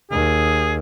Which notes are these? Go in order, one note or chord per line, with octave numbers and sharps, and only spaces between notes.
D#2 G#4